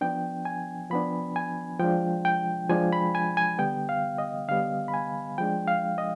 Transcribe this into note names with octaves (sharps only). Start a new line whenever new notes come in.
F3 B3 D4 G5
G#5
F3 B3 D4 B5
G#5
F3 G#3 D4 G5
G5
F3 G#3 D4 G#5
B5
G#5
G#5
D3 G3 B3 G5
F5
D#5
D3 G3 B3 F5
B5
G#5
F3 G#3 D4 G5
F5
D#5